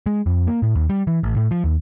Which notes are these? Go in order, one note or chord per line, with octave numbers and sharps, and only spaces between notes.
G#3
F2
A#3
A2
D#2
G3
E3
A1
A2
F3
D#2